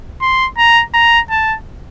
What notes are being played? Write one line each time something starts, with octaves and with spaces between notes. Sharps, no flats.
C6
A#5
A#5
A5